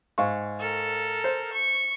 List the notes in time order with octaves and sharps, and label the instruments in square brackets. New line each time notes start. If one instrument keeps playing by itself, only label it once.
[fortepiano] G#2 F5 C#6
[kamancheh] A4 A#4
[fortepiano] C5
[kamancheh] C#6